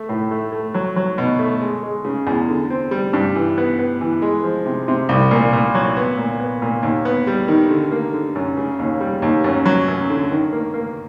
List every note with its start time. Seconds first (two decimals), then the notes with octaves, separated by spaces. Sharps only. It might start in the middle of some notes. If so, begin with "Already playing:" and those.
Already playing: A3
0.09 A2
0.31 A3
0.52 A3
0.74 F#3
0.96 F#3
1.18 B2
1.39 A3
1.62 G#3
1.83 G#3
2.05 C#3
2.27 E2
2.49 D3
2.70 C4
2.91 G3
3.13 G2
3.36 E3
3.58 B3
3.79 B3
4.01 E3
4.22 G#3
4.44 F3
4.66 C3
4.88 C3
5.09 C2
5.31 A#2
5.53 A#2
5.75 F#3
5.96 B3
6.17 A#2
6.40 B3
6.62 A#2
6.83 D#2
7.05 B3
7.27 G3
7.48 D#3
7.70 D3
7.92 A#3
8.13 D3
8.35 F#2
8.57 C#3
8.79 D#2
9.01 G3
9.22 D#2
9.44 F#2
9.66 F#3
9.88 F#2
10.10 D3
10.31 D#3
10.52 A#3
10.74 A#3